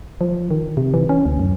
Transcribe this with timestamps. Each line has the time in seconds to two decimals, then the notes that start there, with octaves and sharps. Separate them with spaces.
0.21 F3
0.51 D#3
0.77 C3
0.94 E3
1.09 C#4
1.25 D2
1.40 F#2